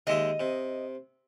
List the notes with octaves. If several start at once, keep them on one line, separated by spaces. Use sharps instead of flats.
D#2 G#3 D#5 E5
C3